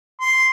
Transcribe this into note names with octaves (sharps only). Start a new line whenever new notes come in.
C6